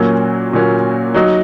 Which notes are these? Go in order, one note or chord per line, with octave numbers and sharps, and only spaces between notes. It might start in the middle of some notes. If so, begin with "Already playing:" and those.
Already playing: A#2 F#3 A#3 C#4 F#4
A#2 F#3 A#3 C#4 F#4
F#3 D#4 F#4